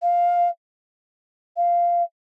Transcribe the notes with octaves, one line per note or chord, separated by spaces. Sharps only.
F5
F5